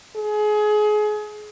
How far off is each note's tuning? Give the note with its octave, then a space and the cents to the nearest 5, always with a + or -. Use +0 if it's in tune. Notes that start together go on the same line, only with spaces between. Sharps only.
G#4 +30